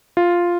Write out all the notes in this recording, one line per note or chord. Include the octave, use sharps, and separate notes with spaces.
F4